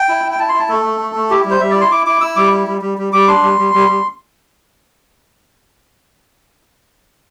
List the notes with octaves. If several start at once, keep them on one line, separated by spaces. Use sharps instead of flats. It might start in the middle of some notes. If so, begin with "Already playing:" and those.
Already playing: G5
E4
E4
G5
E4 A5
C6
E4
A5
A3 A4
A3
A3
A3
E4 G4
G3
C5
G3 E5
E4 D5
C6
E4 D6
E4 D6
E4 E6
G3 D6
E4
G3
G3
G3
G3 D6
D4 C6
G3
G3
G3
G3